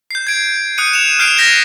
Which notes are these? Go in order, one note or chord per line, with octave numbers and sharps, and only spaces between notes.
G6 C7
G#6 D7
D#6 F#6 C#7 D#7
E7 F7
F6 G6 C7 D7 E7
G6 G#6 A#6 B6 F7